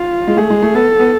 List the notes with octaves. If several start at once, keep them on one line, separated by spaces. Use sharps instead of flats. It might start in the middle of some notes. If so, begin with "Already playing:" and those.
Already playing: F4
G#3
A3 G#4
G#3
A3
B3 A4
B3